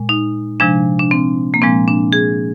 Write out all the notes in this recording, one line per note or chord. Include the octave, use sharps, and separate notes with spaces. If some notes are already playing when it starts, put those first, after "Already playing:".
Already playing: A#2 G#3
D#4
C3 F3 G#3 D4
D4
C4
A#3
A#2 F3 G#3 C4
D4
G#4